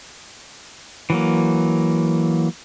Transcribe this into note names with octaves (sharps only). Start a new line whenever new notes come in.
E3 F#3 A#3